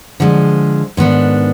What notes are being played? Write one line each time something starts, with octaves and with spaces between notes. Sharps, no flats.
D3 F3 G#3
G#2 D#3 B3 D4